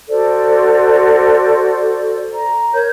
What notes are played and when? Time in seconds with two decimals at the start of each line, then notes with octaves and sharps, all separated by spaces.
0.09 F#4 A4 C5 D5
2.34 A#5
2.74 A#4 C#5 G6